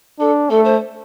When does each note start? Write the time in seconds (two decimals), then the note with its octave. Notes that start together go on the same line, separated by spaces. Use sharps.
0.20 D4 A4
0.50 A3 A4
0.65 C5